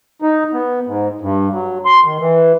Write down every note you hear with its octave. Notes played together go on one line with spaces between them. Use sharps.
D#4
B3
G#2
G2
F#3
C6
D#3
E3